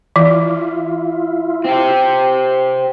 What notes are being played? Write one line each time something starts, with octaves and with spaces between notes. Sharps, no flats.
E3 E4 F4
C4 G4